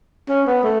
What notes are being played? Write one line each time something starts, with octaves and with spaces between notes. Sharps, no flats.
C#4
B3
A3